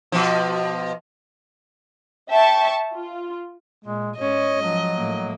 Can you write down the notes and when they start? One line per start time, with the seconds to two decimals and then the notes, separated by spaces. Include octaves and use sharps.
0.12 B2 F3
2.30 E5 G5 A5 C#6
2.94 F4
3.84 A#2 G#3
4.19 G#2 G#3 C#4 C#5 D#5
4.62 F3 F#3
4.96 A2 A#3